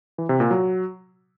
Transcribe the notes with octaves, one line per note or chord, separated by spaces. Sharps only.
E3
C3
A#2
F#3